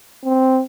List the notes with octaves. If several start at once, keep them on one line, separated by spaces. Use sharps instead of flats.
C4